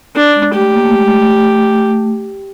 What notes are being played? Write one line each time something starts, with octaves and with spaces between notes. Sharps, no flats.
D4
G#3
A3 G4
A#3
A3
G#3
A3